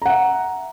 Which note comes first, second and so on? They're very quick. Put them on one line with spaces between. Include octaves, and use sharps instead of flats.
A#5 F#5 E5